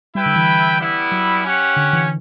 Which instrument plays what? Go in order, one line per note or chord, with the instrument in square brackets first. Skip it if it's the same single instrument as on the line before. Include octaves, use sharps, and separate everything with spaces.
[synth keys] G3 [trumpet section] E4 B4 E5 G5
[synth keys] D3
E3
[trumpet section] G3 B3 E4
[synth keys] F#3
[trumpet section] C#4 G4 C#5 F#5
[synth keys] D3
E3